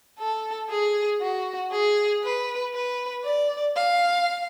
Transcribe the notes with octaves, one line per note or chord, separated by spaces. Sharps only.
A4
G#4
F#4
G#4
B4
B4
D5
F5